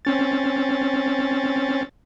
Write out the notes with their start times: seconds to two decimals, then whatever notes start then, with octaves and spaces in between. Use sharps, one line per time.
0.05 C4 C#4 A6